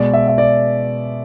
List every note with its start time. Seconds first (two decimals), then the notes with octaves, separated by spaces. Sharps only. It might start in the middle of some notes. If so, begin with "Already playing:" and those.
Already playing: B2 G#3 D5
0.14 E5
0.28 E5
0.38 D5